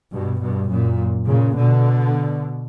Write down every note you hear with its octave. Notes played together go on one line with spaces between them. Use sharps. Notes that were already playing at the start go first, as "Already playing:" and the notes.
G2 B2
G2 B2
F#2 A#2
A#2 C#3
B2 D3